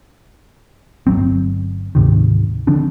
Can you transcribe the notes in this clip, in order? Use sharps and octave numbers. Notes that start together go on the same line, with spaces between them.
G1 F#2 F#3 C4
D2 G#2 C3 D#3
D3 F3 C4 D4